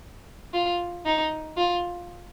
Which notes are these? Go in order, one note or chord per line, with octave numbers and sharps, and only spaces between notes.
F4
D#4
F4